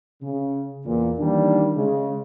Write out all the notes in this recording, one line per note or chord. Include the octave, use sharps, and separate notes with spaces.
C#3
E2 A#2
D#3 E3 G3 A#3 D4
C#3 G#3